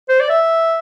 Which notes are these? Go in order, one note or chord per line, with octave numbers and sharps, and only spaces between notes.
C5
D5
E5